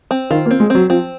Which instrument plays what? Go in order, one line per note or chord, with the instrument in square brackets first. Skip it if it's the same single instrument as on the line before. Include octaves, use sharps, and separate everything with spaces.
[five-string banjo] C4
[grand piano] D#3 [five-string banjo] F4
[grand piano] A#3
[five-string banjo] C4
[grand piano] G#3
[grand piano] F#3 [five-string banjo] C4
[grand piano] F3 [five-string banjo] C4